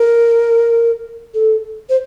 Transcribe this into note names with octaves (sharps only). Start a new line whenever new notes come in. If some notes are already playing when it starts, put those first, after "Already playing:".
Already playing: A#4
A4
C5